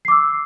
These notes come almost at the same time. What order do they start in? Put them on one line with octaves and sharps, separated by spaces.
C7 D6 E6